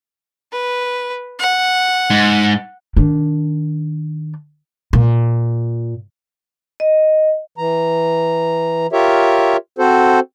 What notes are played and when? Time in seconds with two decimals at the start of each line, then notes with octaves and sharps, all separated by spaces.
0.52 B4
1.39 F#5
2.10 G#2
2.97 D#3 D4
4.93 A#2
6.80 D#5
7.58 E3 A#5
8.92 F4 G4 A#4 C#5 E5
9.78 C4 F#4 A4 C5